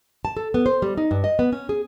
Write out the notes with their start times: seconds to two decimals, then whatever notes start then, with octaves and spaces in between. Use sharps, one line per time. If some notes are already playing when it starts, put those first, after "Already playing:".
0.25 A5
0.37 A4
0.54 B3
0.66 C5
0.82 G3
0.97 D#4
1.11 G2
1.24 D#5
1.39 B3
1.52 C#4
1.69 G#4